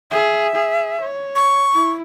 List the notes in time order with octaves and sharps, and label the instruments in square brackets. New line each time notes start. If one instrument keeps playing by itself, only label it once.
[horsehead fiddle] G#4 [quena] E5
[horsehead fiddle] G#4
C#5
[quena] C#6
[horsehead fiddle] E4